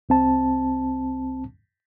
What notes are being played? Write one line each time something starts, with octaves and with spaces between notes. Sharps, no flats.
C2 C4 A5